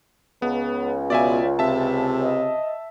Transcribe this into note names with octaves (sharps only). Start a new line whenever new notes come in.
C#2 C#3 B3
B2 F4 D5 E5 G#5
C3 E5 A5
D#5